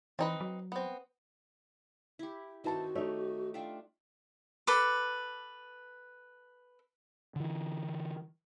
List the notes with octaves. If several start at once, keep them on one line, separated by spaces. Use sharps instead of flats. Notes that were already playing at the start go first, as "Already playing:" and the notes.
E3 C4 D#4 B4
F#3
B3 C4
E4 G4
D#3 C4 E4 F#4 A4 B4 A5
A3 D#4 G4 C#5
D4 F4 E5 G5
A4 B4 D6
D3 E3